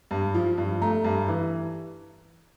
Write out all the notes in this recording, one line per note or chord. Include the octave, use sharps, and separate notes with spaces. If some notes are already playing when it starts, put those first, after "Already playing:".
G2
F3
G2
A3 A#5
G2
E3